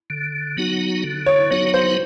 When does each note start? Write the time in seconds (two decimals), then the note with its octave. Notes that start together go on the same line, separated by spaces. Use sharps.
0.10 D3
0.57 F#3 B3 D#4 F#4
1.04 D3
1.26 C#5
1.51 F#3 B3 D#4 F#4 C#5
1.74 C5